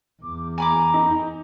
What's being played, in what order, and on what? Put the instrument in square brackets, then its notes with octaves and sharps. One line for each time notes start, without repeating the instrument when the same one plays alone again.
[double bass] E2 [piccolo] D6
[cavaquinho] G#5 B5 D6 [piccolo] A#5
[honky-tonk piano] D#4